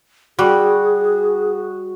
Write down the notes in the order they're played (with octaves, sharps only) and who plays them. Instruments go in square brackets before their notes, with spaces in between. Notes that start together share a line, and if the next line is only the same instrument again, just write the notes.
[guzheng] G3 [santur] F#4 [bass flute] G#4